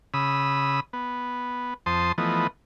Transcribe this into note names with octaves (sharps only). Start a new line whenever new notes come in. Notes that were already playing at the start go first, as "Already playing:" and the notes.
C#3 B5 D#6 E6
B3
F2 C5 A5 C6 D#6
E3 F3 A3 B3 D#5